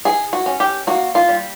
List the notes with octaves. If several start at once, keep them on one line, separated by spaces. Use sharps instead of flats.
E3 G#4
F#4
C#4
G4
A#3 F#4
F4
G3